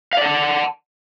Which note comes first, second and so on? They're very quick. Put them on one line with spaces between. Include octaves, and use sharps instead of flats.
F5 D5 F#5 A5